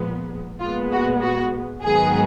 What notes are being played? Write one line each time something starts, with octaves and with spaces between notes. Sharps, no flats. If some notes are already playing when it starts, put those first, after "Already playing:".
Already playing: A#2 F3 G#3 B3
A#2 G#3 B3 F4
F#4
F#4
G#2 D#3 F#3 B3 G#4